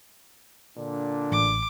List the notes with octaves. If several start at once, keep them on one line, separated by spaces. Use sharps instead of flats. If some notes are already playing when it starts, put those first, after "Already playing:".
A#2 D3 D4
A1 D6